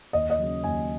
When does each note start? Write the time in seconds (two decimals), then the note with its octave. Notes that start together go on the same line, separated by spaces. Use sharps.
0.13 D#2 D#5
0.30 D#5
0.39 C#3 F#3
0.64 D#2 G#5